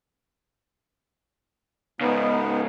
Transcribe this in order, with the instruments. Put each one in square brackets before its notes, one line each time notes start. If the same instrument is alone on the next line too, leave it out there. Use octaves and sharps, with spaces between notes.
[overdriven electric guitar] G#2 C#3 [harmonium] B3 D#4